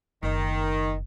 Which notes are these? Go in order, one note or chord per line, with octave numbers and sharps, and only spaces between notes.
F#1 D#3